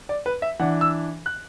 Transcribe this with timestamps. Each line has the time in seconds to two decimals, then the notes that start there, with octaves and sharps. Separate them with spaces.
0.09 D5
0.26 B4
0.42 E5
0.59 E3 D4 F#5
0.81 E6
1.26 F#6